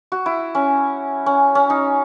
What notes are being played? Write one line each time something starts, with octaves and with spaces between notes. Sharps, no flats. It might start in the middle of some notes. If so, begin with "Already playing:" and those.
F#4
E4
C#4
C#4
C#4
D#4